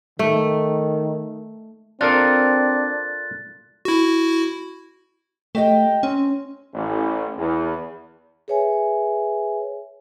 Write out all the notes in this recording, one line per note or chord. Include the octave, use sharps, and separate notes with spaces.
D#3 A3
C4 D4 F4 A4 A#4 F#6 A6
E4 F#4
A3 G4 D#5 G5
C4 C#4
A1
E2
G#4 B4 C#5 E5 G#5